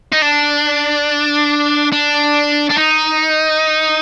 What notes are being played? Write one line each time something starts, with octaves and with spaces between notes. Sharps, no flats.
D#4
D4
D4
D4
D#4